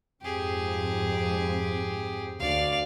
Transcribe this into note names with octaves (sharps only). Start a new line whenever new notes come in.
F2 G#2 G4 G#4
D2 D5 F5